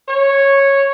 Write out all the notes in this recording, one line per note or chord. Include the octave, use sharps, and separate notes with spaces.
C#5